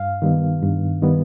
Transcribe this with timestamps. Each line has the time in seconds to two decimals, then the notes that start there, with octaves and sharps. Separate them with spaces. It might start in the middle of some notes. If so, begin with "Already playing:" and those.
Already playing: G2 F5
0.22 D#3 G3 B3
0.62 G2
1.02 D#3 G3 B3